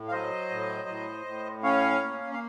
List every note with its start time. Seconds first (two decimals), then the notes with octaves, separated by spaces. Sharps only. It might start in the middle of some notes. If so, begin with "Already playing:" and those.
Already playing: A2
0.08 F5
0.12 F#3 C5 D#5
0.50 A2
0.88 A2
1.26 A2
1.63 C#4 C#5 F5
2.02 A#3
2.33 F5